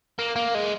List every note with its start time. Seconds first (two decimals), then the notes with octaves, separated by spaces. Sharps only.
0.19 A#3
0.36 A#3
0.55 G#3